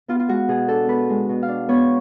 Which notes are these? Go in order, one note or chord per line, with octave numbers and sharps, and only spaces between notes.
B3 F4
F4
G#3 F#4
B2 G#4
D4 A4
B3 B4
G#3
B2
F5
D4
B3 C#5